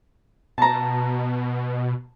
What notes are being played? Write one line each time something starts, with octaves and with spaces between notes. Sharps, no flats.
B2 A5 A#5